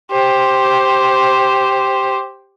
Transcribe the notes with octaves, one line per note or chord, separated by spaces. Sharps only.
G4 C5